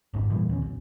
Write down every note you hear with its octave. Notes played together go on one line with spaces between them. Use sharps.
G#1 F2 G#2
A#2 E3 G3
E2 D#3 C#4
B1